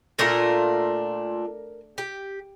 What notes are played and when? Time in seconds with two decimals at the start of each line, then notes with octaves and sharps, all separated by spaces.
0.19 A#2 A3 D4 F4 A#4
1.98 G4